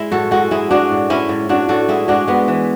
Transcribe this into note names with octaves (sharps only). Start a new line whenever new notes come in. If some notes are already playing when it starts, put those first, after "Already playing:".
Already playing: G#3 E4
A2 F#4 A4
G#3 F#4 A4
G#3 E4 G#4
G#3 D4 F#4
A2
G#3 C#4 E4
A2
A2 D4 F#4
A2 F#4 A4
G#3 E4 G#4
G#3 D4 F#4
G#3 B3
E3